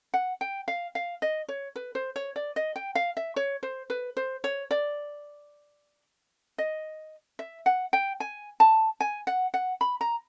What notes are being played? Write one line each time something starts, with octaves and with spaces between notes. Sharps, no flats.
F#5
G5
F5
F5
D#5
C#5
B4
C5
C#5
D5
D#5
G5
F5
E5
C#5
C5
B4
C5
C#5
D5
D#5
E5
F#5
G5
G#5
A5
G#5
F#5
F#5
B5
A#5